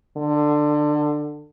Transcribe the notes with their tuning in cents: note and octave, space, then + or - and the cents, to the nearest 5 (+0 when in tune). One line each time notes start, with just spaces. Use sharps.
D3 +20